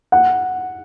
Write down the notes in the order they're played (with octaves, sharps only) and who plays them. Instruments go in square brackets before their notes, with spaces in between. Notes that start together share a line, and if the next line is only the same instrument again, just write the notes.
[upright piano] F#5